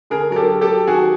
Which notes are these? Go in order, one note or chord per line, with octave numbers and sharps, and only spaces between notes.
D3 G#4 A#4
F#3 A#4
G4 A4
F#3
G4 A4
F#3
D#3 F#4 G#4